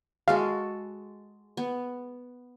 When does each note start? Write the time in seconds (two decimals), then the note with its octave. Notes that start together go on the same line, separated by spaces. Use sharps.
0.28 G#3 F#4 A4 F5
1.57 B3